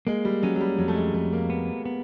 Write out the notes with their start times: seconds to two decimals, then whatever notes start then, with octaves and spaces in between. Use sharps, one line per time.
0.07 G#3 A#3
0.25 G3
0.43 F#3 C#4
0.55 F#3
0.61 G3
0.78 F2 F#3
0.88 A3
0.96 G#3
1.13 F2 A3
1.32 A#3
1.50 B3
1.85 B3